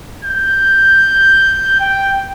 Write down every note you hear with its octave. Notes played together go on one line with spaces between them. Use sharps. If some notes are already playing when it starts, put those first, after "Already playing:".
G6
G5